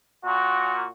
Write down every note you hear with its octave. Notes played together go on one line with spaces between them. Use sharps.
A#2 F#4